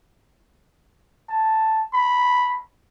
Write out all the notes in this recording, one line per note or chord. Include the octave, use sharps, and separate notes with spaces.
A5
B5